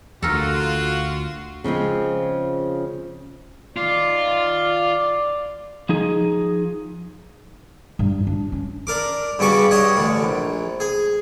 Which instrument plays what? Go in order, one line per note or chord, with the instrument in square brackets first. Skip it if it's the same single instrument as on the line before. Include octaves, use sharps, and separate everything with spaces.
[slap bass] D2 [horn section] F4 F#4 [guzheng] A4 A#4
[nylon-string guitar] C#3 F3 G#3 C4
[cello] D#3 [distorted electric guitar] F4 [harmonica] D5
[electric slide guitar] F3 D#4 G#4
[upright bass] G2
D4
C#4
[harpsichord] D4 A#4 D6
G2 C#3 B3 F#4 C#6 D6
G2 C#5 D#5 F#5 D#6
A1 D3
A#1
G#4